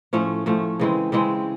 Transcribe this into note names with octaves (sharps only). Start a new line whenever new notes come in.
A2 F3 A3 C#4
A2 F3 A3 C#4
C#3 E3 G#3 C4
C#3 E3 G#3 C4